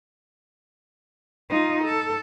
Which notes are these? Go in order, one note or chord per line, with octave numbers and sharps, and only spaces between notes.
D#4 F4
A4